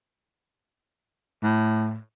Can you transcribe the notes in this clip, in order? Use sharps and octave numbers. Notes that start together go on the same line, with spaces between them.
A2